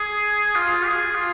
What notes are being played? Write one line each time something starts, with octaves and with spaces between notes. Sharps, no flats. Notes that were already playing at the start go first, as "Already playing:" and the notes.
Already playing: G#4
F4
G#4
F4